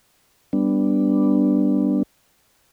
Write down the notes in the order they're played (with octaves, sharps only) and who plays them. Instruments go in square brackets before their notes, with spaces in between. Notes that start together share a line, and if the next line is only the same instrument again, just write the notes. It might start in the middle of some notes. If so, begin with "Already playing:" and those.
[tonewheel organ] G3 B3 D4